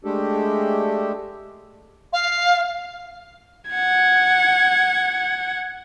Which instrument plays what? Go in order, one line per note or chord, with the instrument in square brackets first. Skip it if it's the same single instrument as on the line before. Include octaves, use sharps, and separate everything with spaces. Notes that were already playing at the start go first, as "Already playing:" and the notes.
[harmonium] G#3 A3 D4 G4 A4
[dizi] F5
[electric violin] F#5 G#6